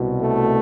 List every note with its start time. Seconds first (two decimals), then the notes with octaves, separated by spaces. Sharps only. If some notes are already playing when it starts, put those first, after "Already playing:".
Already playing: C2 B2
0.19 A3